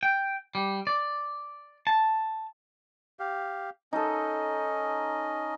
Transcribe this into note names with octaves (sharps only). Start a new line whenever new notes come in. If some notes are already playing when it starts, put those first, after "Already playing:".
G5
G3
D5
A5
G4 F5
C#4 D#4 A4 D#5